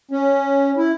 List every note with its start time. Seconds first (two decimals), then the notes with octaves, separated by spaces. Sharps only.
0.11 C#4
0.77 E4